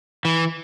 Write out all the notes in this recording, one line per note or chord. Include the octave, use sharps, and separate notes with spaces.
E3